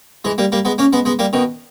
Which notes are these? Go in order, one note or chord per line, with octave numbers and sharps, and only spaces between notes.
E3 G#3
G3 A#3
G3 A#3
G#3 B3
A#3 C#4
G#3 B3
G#3 B3
G3 A#3
B2 D#3